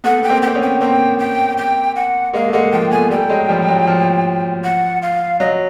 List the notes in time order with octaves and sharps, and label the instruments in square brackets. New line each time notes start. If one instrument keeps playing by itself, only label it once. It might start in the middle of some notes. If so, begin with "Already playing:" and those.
[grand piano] A3 B3 [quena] F#5
[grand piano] B3 [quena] G5
[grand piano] A#3 C4
[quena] G5
[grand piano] C4
B3 C#4
[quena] G5
[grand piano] A#3 C4 [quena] G5
[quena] G5
G5
F#5
[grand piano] G#3 A#3 [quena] F5
[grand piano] A3
[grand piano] G#3 A#3 [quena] F#5
[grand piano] F3 [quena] G5
[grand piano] A3 B3 [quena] G#5
[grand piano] G3 A3 [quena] G5
[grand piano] A3
F#3 G#3
F3 G3
F3
F#3
F3
[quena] F#5
F5
[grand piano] F#3 [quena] D#5